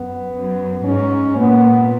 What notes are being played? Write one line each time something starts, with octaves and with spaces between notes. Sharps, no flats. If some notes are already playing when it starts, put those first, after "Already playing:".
Already playing: F#2 B3
F#2
G#2 C#4
A#2 B3